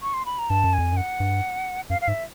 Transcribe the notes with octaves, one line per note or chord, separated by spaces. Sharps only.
C#6
C6
B5
A#5
G2 A5
F#2
G#5
F2
F#2
F#5
G2
F#2 F5
F5
G#2 E5